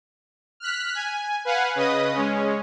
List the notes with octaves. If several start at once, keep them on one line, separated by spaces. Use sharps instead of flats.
F6 F#6 B6
G#5
B4 F5 F#5 G#5
C#3 B4 D#5 D#6
G#3 C#4